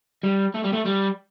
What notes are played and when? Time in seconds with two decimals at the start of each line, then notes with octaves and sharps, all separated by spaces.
0.23 G3
0.54 A3
0.64 G3
0.73 A3
0.85 G3